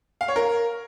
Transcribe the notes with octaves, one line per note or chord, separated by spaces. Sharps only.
F5
C#5
A#4